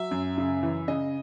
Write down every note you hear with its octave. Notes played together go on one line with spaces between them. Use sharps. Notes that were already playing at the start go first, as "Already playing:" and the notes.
Already playing: F#3 E5
F#2
C#3
E3
C#3 D#5